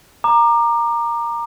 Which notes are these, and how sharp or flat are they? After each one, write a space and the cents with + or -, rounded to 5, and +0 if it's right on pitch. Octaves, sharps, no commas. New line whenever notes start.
A#5 +0 D6 +30